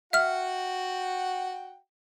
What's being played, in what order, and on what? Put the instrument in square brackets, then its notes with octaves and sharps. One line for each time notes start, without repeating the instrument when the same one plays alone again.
[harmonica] F#4 F#5 G5 [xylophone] E5 F6